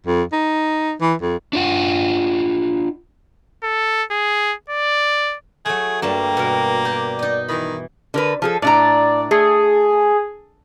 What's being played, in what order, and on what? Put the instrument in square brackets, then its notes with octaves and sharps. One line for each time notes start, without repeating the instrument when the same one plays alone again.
[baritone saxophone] F2
D#4
E3
F2
[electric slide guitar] D4 F4 F#5
[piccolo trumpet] A4
G#4
D5
[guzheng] F#3 A3 [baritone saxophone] G#4
[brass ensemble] D2 F#4 G5 [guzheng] G2 G3 A5 [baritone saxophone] A#3
[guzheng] B2 A#4
G4 D5
[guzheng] D#4 D#5 [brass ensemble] D5
[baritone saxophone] D#3 [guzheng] E3 B5 [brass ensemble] D#4 E4
[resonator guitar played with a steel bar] D3 A#4 B4
F3 G#4 A4
[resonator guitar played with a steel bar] A2 D4 A#5 [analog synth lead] D5
[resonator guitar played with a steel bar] A3 [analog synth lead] G#4